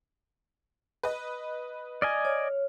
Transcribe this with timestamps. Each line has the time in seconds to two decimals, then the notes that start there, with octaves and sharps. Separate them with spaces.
1.03 B4 D#5
2.02 D5 D#5 G#5 F6
2.25 C#5